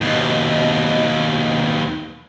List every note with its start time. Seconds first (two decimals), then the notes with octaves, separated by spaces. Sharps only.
0.01 D#2 B2